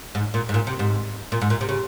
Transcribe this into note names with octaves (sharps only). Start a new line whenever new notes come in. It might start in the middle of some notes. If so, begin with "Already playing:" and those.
G#2
A#2
G#2
A#2
C3
G#2
A#2
G#2
A#2
C3
C#3